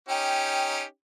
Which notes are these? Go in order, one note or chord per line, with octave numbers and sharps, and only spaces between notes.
C#4 D#4 G4 G5